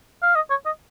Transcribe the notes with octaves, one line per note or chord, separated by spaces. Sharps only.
F5
D#5
C#5
D#5